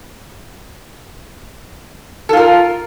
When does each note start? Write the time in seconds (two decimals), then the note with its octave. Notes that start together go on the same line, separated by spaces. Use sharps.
2.29 A4
2.33 F4
2.37 A#4